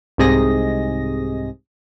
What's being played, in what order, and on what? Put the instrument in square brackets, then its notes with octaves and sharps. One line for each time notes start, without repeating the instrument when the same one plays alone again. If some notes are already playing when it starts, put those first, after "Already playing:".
[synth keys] C2 G#2 C3 G#4 D#5 A#6